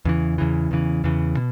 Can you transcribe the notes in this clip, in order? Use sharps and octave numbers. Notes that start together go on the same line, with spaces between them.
E2 C#3 E3
E2 C#3 E3
E2 C#3 E3
E2 C#3 E3
B2